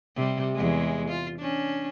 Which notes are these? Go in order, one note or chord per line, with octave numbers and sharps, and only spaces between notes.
C3 G3
E2 G#3
F4
C#4 D4